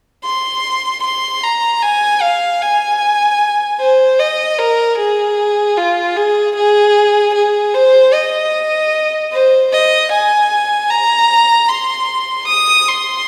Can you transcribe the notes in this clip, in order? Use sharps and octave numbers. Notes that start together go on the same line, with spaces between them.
C6
C6
A#5
G#5
F5
G#5
C5
D#5
A#4
G#4
F4
G#4
G#4
G#4
C5
D#5
C5
D#5
G#5
A#5
C6
D#6
C6